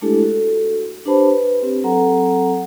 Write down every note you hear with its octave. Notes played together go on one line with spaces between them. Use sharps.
G#3 A3 D4 E4 G4 A4
F#4 A4
D4 G4 B4 C5 A5 B5
B4
C4 G4
F#3 C4 A4 F#5 A#5